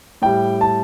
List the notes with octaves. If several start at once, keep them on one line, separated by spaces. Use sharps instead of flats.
A2 G3 G5
A5